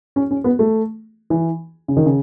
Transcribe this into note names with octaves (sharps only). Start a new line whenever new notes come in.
C#4
C#4
B3
A3
E3
C#3
D#3
C#3